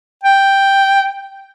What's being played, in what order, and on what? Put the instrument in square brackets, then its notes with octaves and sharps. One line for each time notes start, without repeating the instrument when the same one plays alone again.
[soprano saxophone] G5